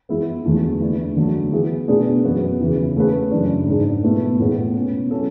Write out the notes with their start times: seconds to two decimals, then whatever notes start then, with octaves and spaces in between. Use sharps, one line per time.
0.09 E3 G#3 B3 E4
0.45 E2 D3 F#3 A3
0.80 E3 A3 D4
1.16 D3 F#3 A3
1.52 E3 B3 E4 G#4
1.88 B2 A3 D4 G#4 B4
2.24 F#2 E3 B3 F#4 B4
2.60 E2 C#3 E3
2.95 E3 A3 C#4 G#4 B4
3.31 F#2 C#3 E3 G#3 D4
3.67 G#2 G#3 D4
4.03 B2 A3 E4 B4
4.39 A2 G#3 B3
4.76 B2 G#3 C#4
5.11 F#3 C#4 E4 A4